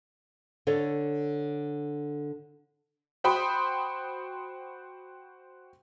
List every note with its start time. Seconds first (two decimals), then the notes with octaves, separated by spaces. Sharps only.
0.67 D3 A4 C#5 D5
3.24 F#4 C5 G5 B5 C6 D#6